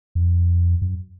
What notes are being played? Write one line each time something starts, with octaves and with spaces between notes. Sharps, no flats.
F2
F#2